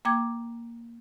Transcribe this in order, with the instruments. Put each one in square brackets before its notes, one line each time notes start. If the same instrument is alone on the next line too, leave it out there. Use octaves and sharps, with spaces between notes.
[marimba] A#3 G5 D6 G#6